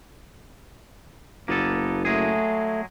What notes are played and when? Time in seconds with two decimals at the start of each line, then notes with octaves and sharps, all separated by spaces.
1.48 F#1 A#3 B3 A4
2.05 F#3 G#3 A3 G#4